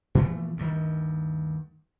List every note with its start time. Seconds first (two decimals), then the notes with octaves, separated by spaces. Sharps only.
0.15 A#2 E3 F3 A3
0.57 D2 G2 D#3